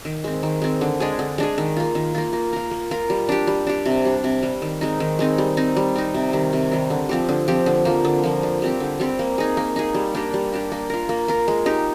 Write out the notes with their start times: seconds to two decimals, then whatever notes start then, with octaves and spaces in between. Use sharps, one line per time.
0.05 D#3
0.24 G#3 C4
0.43 D#3
0.62 G#3 C4
0.81 D3
1.00 G#3 D4 G#4
1.19 D3
1.38 G#3 D4 G#4
1.58 D#3
1.77 A#3 F4
1.95 D#3
2.15 A#3 F4
2.33 A#3
2.53 F4 A#4
2.71 A#3
2.91 F4 A#4
3.10 G3
3.29 D4 G4
3.47 G3
3.67 D4 G4
3.86 C3
4.05 G3 D4
4.24 C3
4.43 G3 D4
4.62 D#3
4.81 G#3 C4 D#4
5.00 D#3
5.19 G#3 C4 D#4
5.38 G3
5.57 C4 D#4
5.77 G3
5.96 C4 D#4
6.14 C3
6.33 D#3 G3
6.53 C3
6.72 D#3 G3
6.90 D3
7.09 F3 C4 G4
7.29 D3
7.48 F3 C4 G4
7.66 D3
7.85 F3 A#3
8.05 D3
8.24 F3 A#3
8.43 D3
8.62 G3 C4 G4
8.80 D3
9.00 G3 C4 G4
9.19 A#3
9.38 D#4 G#4
9.57 A#3
9.76 D#4 G#4
9.94 G3
10.15 A#3 D4 G4
10.34 G3
10.53 A#3 D4 G4
10.72 A#3
10.90 F4 A#4
11.09 A#3
11.28 F4 A#4
11.48 G#3
11.66 D#4 G4